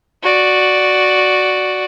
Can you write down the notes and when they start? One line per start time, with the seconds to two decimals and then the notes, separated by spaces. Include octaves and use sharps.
0.22 F#4 D5